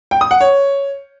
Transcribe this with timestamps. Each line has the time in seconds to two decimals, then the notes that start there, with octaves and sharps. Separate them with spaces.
0.11 G5
0.21 D#6
0.31 F#5
0.41 C#5